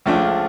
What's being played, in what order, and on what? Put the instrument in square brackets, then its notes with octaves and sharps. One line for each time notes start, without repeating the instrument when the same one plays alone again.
[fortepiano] C#2 C#3 F3 A3 D4